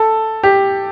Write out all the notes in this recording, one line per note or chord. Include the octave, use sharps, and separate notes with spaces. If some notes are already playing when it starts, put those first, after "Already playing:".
Already playing: A4
G4